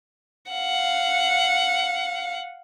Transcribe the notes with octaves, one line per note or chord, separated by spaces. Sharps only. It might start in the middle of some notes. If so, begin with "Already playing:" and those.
F5 F#5